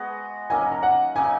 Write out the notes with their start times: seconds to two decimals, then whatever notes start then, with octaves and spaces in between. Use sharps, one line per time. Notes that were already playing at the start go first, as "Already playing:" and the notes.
Already playing: G#3 B3 F#4
0.50 D#3 F#3 A#3 C#4 G#5
0.61 G#5
0.72 A#5
0.83 F#5
1.15 C#3 F#3 A#3 D#4 G#5